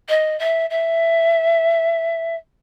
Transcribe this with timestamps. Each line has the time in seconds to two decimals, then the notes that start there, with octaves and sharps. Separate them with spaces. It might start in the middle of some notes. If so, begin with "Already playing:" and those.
0.09 D#5
0.39 E5
0.70 E5